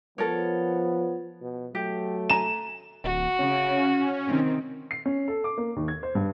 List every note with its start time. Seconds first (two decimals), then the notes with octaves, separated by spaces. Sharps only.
0.18 F3 B3 A4 A#4 C#5
1.41 B2
1.75 F#3 A3 G4
2.30 G#5 A#5 E7
3.04 D1 F#4
3.39 C#3 C#4
4.25 C3 D#3 C4
4.91 C7
5.06 C#4
5.28 A4
5.44 D6
5.58 A#3
5.76 D#2
5.88 G#6
6.03 C5
6.15 G2